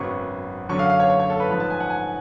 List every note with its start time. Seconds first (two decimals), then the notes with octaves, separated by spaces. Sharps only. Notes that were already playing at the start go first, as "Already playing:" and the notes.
Already playing: G#1 F#2 C#3 F#3 B3 C#6
0.69 F#2 D3 F#3 C#4 C#6
0.79 F5
0.90 F5
1.00 C#5
1.10 C#5
1.20 C#5
1.30 A4
1.40 B4
1.50 G#2 F3 A3 C#4 B4
1.60 A5
1.70 G#5
1.80 F#5
1.90 G#5